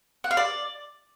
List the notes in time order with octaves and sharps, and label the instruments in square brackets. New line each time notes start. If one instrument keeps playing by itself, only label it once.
[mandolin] F#5
F5
D5